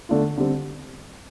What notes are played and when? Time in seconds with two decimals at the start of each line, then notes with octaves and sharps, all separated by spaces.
0.09 D3 A3 D4 F4
0.37 D3 G3 C4